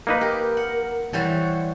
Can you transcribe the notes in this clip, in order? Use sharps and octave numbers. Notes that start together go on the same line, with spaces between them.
A#3 D#4 B4 F5
G4 A#4
F#5
E3 G3 C5 C#5 F#5 C#6